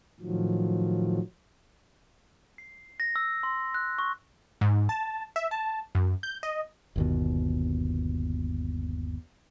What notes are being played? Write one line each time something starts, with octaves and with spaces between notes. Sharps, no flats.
A2 D#3 F3 F#3
C7
A#6
E6
C6
F#6
C#6
G#2
A5
E5
A5
F#2
G6
D#5
G1 D#2 B2